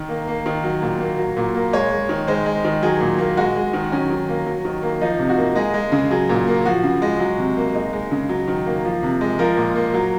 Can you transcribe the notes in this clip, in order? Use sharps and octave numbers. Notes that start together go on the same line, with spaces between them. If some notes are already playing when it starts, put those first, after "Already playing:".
Already playing: D#3
A#3
A#3
D#3
F#3
A#2
A#3
F#3
A#2
A#3
G#3 C#5
G#3
D#3
G#3 C5
G#3
D#3
F#3 G#4
A#2
A#3
G#3 F#4
G#3
D#3
F#3 C#4
D#3
A#3
F#3
D#3
A#3
F3 D#4
C3
F#4
A#3
G#3 G#4
G#3
C#3
F#3 G#4
A#2
A#3
F3 F#4
C#3
G#3
F#3
C3
A#3
G#3 D#4
G#3
C#3
F#3
D#3
A#3
F3
C3
G#3
F3 A#4
A#2
A#3
F#3